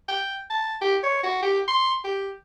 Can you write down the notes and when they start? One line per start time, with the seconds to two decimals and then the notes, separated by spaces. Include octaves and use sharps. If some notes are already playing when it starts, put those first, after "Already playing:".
0.08 G5
0.50 A5
0.81 G4
1.03 C#5
1.23 F#4
1.42 G4
1.68 C6
2.04 G4